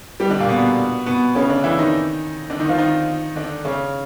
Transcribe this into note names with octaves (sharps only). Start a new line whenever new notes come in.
G3 G4
D3 D4
A#2 A#3
B2 B3
B2 B3
C#3 C#4
D3 D4
E3 E4
D#3 D#4
D3 D4
D#3 D#4
F3 F4
D#3 D#4
D3 D4
C#3 C#4